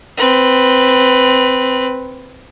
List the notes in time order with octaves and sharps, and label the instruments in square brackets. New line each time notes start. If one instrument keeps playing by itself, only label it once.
[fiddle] C4 B4